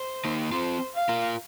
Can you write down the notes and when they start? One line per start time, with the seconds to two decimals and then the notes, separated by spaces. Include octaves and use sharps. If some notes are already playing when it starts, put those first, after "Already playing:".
Already playing: C5
0.25 A#3 D#4
0.52 C4 F4 C5
0.95 F5
1.09 F4 A#4